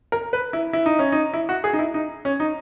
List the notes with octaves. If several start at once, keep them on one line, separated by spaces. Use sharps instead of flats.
A#4
B4
E4
E4
D#4
C#4
D#4
E4
F#4
G#4
D#4
E4
D#4
C#4
D#4